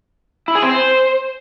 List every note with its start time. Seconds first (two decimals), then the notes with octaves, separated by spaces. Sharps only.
0.48 E4
0.55 G#4
0.62 C4
0.70 C5